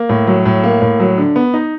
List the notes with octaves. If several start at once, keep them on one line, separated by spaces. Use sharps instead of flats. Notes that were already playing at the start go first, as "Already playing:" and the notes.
Already playing: A#3
A2
F#3
A2
A#3
A2
F#3
D3
B3
D#4